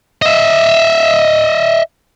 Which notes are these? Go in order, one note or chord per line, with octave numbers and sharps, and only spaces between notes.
D#5 E5